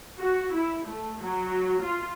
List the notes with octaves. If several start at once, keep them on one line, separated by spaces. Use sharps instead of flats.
F#4
E4
A3
F#3
F4